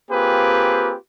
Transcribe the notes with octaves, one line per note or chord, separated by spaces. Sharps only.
A#3 C4 F4 G4 G#4 B4